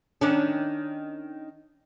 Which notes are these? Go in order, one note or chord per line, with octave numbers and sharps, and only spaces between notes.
D#3 C#4 D4